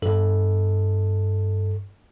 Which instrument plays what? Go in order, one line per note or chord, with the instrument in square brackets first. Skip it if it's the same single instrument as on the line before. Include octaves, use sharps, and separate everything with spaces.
[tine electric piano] G2 A4